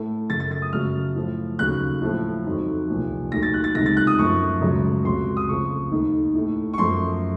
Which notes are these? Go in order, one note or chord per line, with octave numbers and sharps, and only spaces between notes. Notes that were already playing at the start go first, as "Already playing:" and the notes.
Already playing: A2 A3
F#2 C#3 A3 A6
A6
A6
D#6
F#2 C#3 F#3 A3 F6
A2 F3 A3
D#2 C#3 F#3 F#6
A2 F3 A3
F2 D#3 F#3
C2 A#2 F3
D#2 D#3 F#3 A3 A#6
A6
F#6
A6
C#2 C3 D#3 A#6
A6
F#6
D#6
F#2 F3 A3 C#6
C#2 C#3 F#3 A3
C#2 C3 F#3 C6
D#6
F2 C#3 F3 A3 C#6
D#2 D#3 A3
A2 A3
C#6
F#2 F3 A3 C6